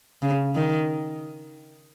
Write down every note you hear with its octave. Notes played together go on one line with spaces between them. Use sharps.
C#3
D#3